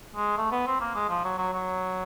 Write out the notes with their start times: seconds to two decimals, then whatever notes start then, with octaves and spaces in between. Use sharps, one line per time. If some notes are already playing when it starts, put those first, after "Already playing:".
0.16 G#3
0.37 A3
0.52 B3
0.67 C4
0.80 A#3
0.95 G#3
1.09 F3
1.24 F#3
1.38 F#3
1.53 F#3